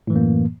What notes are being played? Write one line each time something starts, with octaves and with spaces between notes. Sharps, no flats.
F#2 A2 E3 A#3